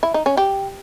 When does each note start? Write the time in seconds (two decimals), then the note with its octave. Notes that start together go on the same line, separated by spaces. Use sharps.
0.03 E4
0.14 D#4
0.26 C#4
0.37 G4